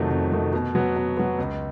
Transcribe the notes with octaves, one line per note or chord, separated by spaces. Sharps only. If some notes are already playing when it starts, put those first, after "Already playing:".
Already playing: F2 C3 D#3 F#3 A3
F2
C3 D#3 F#3 A3
B2
F#3 B3
B2
F#3 B3
C#2